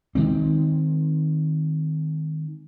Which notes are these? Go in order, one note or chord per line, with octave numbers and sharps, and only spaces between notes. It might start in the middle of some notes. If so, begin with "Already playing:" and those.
D#3 G#3 C4